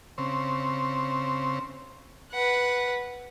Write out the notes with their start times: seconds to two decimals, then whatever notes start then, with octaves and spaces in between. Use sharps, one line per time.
0.18 C#3 C4
2.32 B4 F#5